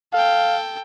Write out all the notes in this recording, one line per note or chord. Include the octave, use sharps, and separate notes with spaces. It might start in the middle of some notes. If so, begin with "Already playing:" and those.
A4 F5 G5